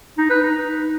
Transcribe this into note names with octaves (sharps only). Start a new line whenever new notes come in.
D#4
B4
D#4